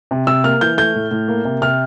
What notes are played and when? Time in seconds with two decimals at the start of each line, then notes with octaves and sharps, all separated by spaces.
0.11 C3
0.27 C3 E6
0.44 A#3 F6
0.61 E3 G6
0.77 A3 G6
0.95 A2
1.11 A2
1.28 A#3
1.45 C3
1.62 C3 F6